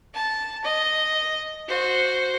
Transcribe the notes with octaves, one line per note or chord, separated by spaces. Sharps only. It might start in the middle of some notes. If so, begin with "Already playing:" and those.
A5
D#5
F#4 C5